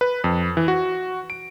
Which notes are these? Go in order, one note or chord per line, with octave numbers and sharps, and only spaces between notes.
B4
F2
E3
F#4
D7